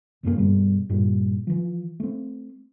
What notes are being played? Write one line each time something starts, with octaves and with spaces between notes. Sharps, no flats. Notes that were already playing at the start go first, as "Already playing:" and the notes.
A#1 F#2 C#3 A#3
G2 B2 G3
G2 A#2 G3
E3 F3
A3 C4